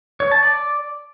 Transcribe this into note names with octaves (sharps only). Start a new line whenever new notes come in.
C#5
A5
D5